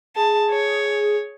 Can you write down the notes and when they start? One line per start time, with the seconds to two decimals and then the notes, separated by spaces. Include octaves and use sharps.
0.16 G#4 A5
0.51 C#5